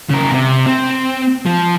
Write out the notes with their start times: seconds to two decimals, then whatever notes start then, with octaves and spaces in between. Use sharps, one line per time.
0.09 C#3 A#4
0.31 C3
0.66 C4
1.46 F3